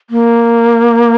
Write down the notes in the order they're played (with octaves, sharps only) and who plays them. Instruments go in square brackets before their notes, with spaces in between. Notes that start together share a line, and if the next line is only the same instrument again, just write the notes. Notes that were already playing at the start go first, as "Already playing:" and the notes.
[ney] A#3